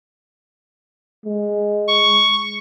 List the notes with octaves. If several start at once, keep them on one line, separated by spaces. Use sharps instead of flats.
G#3
C#6